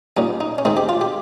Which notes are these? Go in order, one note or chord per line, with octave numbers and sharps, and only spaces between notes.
A#2 G3 C#4 D#4
D#4
C#4
D#3 G#3 C4 D#4
G4
F4
G4